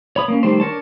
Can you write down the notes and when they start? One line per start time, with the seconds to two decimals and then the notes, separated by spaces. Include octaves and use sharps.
0.16 C#5 B5 D#6
0.28 A#3 C#4
0.43 D#3 G3 A3 C5
0.60 D4 A#4 C#5 A5